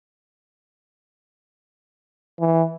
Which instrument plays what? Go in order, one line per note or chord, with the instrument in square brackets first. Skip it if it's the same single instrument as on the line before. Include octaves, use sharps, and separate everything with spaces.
[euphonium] E3